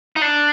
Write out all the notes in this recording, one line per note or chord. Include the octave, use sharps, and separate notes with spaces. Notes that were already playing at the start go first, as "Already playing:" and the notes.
D#4
D4